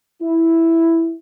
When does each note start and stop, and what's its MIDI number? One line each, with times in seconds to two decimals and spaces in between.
0.22 1.13 64